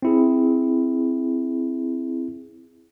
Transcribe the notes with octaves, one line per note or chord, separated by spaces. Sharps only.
C4 E4 G#4